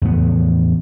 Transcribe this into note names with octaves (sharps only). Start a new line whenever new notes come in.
E2 A2 F3 B3